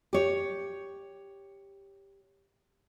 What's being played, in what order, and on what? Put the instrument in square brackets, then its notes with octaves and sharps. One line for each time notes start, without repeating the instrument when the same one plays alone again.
[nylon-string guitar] G4 C#5